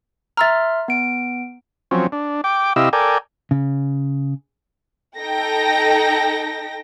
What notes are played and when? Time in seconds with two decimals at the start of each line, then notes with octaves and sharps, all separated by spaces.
0.37 E5 A#5 C6 E6 F6 A6
0.88 B3 D7
1.91 F3 F#3 C4 C#4
2.12 D4
2.44 G5 D6
2.76 C3 E4 G4 D#5 F5 E6
2.93 A4 A#4 D5 G5 G#5
3.51 C#3
5.18 D#4 A4 G5 A#6